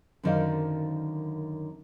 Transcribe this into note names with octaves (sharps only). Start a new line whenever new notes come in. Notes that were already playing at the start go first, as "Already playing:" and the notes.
F#2 D3 D#3 C5 D5 F5